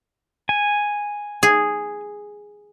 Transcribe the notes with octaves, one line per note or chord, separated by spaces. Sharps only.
G#5
G#4